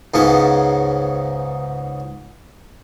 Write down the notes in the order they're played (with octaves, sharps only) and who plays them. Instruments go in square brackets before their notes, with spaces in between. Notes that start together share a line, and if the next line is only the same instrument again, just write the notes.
[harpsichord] C#2 G#2 C#3 B3 A5